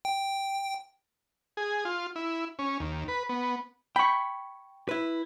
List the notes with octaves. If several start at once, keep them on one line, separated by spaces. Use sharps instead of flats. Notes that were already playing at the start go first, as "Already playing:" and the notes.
G5
G#4
F4
E4
C#4
D#2
B4
B3
G5 B5 C#6
E4 B4